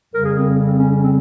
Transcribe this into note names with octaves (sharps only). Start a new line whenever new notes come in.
F2 C#3 G3 A#4
G#4
C4
C4
C#4
C#4
C4